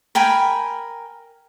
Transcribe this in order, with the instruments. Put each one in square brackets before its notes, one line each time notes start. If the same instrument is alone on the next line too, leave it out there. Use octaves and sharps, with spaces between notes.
[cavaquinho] A#4 G5 G#5 B5